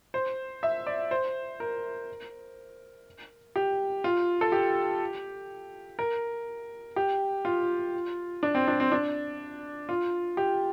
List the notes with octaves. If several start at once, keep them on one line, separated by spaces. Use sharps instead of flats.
C5
E5
D5
C5
A#4
G4
F4
A4
G4
A#4
G4
F4
D4
C4
D4
C4
D4
F4
G4